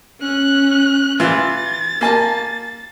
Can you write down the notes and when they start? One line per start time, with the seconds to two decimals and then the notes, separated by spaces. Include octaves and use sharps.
0.20 C#4 F#6
1.20 E3 F4 A6
2.01 A#3 G#5 A5